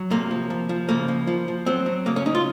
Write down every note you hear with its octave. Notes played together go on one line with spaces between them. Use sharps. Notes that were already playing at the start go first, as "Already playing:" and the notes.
Already playing: F#3
C3 A#3
F3
F3
F3
C#3 A#3
F3
F3
F3
F#3 C4
F#3
C#3 A#3
C#4
C#3 D#4
F4